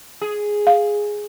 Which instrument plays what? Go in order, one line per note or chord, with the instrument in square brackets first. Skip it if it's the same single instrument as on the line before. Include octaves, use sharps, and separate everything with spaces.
[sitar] G#4
[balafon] F5